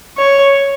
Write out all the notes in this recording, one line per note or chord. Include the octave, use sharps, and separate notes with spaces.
C#5